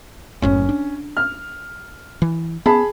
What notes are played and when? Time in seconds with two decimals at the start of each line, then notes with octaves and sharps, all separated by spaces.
0.42 F#1 F#2 A2 C#4
0.69 D4
1.17 F6
2.22 E3
2.66 B3 G#4 A5 B5